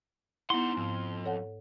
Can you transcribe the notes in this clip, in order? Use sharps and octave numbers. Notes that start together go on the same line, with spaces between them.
B3 D#4 E4 F#5 C6
F2 G#2
A4 C#5 F#5